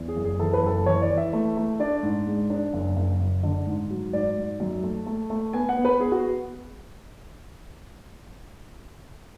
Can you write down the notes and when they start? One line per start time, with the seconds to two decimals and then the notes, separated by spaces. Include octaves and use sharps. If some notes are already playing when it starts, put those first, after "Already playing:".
Already playing: E2
0.08 G#4
0.16 F#1
0.24 G#4
0.39 E3 A4
0.53 B4
0.63 F#1 A4
0.86 E3 C#5
1.02 D5
1.10 E3
1.18 E5
1.33 A3
1.57 A3
1.80 D4 D5
2.03 G#2
2.27 G#3
2.50 D4
2.73 F#1
2.96 F#1
3.20 F#1
3.43 D3
3.66 G#2
3.90 F#3
4.13 G#2 D5
4.37 G#2
4.60 F#2
4.84 A3
5.06 A3
5.30 A3
5.53 B3 G#5
5.69 F#5
5.77 B3
5.85 B4
5.99 B3 G#4
6.12 F#4